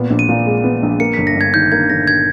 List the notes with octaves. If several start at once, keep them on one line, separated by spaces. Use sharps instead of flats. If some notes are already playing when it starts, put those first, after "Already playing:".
Already playing: A#2 B3
A#1
D#7
A#2
G#3
B3
A#1
A#3 C#7
G1 B6
A#6
G2
G#6
D#3 G6
A#3 G#6
G1 A#6
G#6